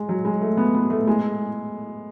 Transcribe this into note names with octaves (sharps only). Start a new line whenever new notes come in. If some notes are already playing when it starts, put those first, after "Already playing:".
Already playing: G#3
F#3
G#3
A3
B3
B3
A3
G#3